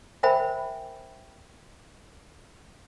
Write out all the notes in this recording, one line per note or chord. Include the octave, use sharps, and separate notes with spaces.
A#4 C5 E5 G5 G#5 B5